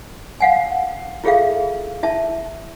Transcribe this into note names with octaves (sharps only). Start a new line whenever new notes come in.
F5 F#5 G#5
E4 F4 G#4 A4 E5 F5
E4 E5 A5